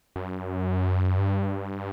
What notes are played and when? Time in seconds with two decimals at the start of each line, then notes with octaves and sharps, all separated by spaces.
0.16 F#2
1.18 G2